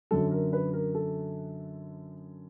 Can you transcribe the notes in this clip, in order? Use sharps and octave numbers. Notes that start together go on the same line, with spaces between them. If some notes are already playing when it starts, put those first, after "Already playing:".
F#2 D3 F#3 A4
A#4
B4
A#4
A4